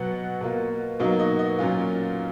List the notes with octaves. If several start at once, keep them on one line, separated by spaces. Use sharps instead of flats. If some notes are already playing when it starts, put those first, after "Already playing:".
Already playing: B2 F#3 B3 F#5
B2 A#3 F4
B2 F#3 A#3 D#4 F5
D#5
D#5
A#2 F#3 C#4 F4